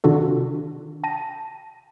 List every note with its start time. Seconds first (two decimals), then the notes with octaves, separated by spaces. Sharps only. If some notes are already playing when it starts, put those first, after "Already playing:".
0.04 C3 D#3 D4 F4 F#4 A4
1.03 G5 A5 A#6 D#7